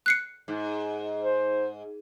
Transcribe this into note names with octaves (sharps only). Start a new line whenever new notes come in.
F#6 C7 C#7
G#2
C5